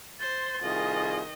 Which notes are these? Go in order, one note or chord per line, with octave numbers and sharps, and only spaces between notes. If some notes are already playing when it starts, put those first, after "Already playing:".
C5 C6 A6
C2 D#3 F4 G#4 D#5